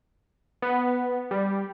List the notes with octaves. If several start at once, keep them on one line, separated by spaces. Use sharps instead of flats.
B3
G3